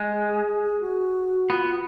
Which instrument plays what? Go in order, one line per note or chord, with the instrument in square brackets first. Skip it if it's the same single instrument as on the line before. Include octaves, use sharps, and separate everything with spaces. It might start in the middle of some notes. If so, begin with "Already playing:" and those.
Already playing: [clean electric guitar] G#3
[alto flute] G#4
G#4
G#4
G#4
F#4
[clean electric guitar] B3 [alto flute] F4